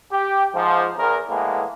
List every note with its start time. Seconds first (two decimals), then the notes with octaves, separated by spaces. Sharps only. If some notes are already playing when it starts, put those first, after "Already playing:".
0.13 G4
0.55 G#2 F3
0.98 E2 A#4
1.29 A2 E3 G#3 A#3 B3